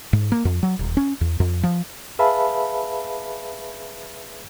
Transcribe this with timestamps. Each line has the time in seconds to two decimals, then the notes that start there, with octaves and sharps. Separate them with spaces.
0.13 G#2
0.32 A#3
0.45 F2
0.63 F#3
0.79 D#1
0.97 C#4
1.21 E2
1.40 F2
1.63 F3
2.19 G#4 B4 E5 F5 A5 B5